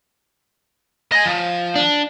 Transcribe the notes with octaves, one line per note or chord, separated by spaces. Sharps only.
D#5 G#5
F3
D4